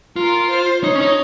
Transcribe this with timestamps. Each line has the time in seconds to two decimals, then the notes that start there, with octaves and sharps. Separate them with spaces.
0.16 F4 A#4
0.50 C5
0.83 D#4 C#5
0.95 C#4
1.00 D#4